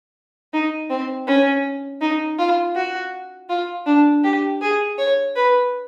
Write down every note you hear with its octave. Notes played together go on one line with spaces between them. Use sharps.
D#4
C4
C#4
D#4
F4
F#4
F4
D4
G4
G#4
C#5
B4